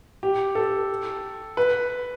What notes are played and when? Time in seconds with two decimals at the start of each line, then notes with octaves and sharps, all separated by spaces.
0.23 G4
0.55 A4
1.57 B4